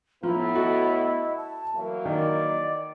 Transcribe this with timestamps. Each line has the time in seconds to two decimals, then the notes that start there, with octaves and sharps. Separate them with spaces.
0.23 A2 F3 B3 E4 A#5
0.55 F#4 A4 D#5
1.37 A5
1.76 E3 F#3 A#3 E5
2.06 D#3 D5 D#5